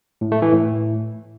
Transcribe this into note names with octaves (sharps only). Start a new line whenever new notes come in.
A2
A3
E3
A2